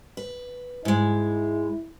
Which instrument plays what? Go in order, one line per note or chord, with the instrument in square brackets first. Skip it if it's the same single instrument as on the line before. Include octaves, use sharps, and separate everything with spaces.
[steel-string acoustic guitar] B4
[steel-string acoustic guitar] G#2 G#3 [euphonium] E4